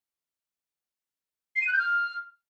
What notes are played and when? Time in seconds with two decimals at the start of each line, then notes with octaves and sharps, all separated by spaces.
1.56 C7
1.61 D#7
1.67 F#6
1.73 G6
1.79 F6